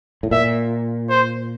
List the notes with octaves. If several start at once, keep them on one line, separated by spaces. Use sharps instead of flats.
A2
A#2 E5
C5